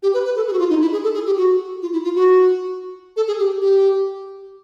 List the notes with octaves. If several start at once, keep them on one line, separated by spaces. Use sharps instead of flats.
G4
B4
B4
A4
G#4
F#4
F4
D#4
E4
G#4
A4
G#4
G4
F#4
F4
E4
F4
F#4
A4
G#4
G4
G4